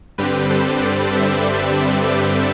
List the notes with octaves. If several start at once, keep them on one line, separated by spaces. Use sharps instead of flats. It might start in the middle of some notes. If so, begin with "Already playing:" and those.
G2 D3 G3 C4 G4 B4
A4 C5
B4 D5
C5 E5
B4 D5